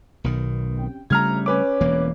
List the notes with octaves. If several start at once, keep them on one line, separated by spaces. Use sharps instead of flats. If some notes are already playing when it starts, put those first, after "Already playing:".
B1 B2 D#3
C3 C#4 G5
G1 C#3 G3 A3 A#5 F6 G#6
C#4 B4 C#5 D6
E1 E3 A#3